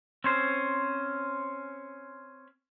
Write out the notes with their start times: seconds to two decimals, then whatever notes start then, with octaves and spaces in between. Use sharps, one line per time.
0.24 C4 C#4 C5